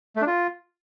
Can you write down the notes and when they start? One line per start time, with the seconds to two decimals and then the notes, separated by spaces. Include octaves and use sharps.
0.16 A3
0.22 D4
0.27 F4